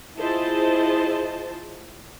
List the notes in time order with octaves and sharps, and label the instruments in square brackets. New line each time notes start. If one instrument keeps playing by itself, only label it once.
[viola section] E4 F4 G#4 C5 D#5 A5